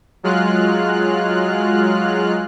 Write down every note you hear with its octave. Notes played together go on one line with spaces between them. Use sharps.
F#3 G#3 F4 F6 F#6